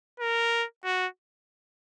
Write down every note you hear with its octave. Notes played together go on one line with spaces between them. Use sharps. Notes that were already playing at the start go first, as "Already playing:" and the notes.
A#4
F#4